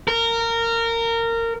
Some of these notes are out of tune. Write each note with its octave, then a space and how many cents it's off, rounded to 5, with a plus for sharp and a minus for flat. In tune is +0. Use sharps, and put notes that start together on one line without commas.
A#4 -20